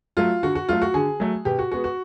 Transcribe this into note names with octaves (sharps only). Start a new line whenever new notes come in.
F#3 A3 F4
D3 F#4
F#4
F#3 A3 F4
F#4
D3 G#4
F#3 A3
B2 G4
F#4
G#3 B3 F#4
F#4